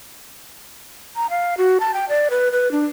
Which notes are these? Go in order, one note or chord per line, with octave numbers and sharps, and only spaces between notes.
A#5
F5
F#4
A5
G5
D5
B4
B4
D4